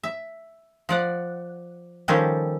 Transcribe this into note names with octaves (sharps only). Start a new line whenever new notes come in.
E5
F3 D5 F#5
D#3 F3 G3 C#4 A4